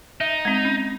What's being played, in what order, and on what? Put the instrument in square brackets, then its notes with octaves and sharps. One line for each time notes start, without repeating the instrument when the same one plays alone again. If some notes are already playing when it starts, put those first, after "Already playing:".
[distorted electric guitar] D#4 [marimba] E5
[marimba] G#3 C4
C#4